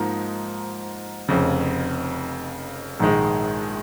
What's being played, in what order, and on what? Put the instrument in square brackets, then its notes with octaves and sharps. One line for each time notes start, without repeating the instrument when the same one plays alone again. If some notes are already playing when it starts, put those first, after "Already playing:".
Already playing: [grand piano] G#2 F3 A#3 D#4
F1 F2 C#3
A#1 G#2 D#3 G#3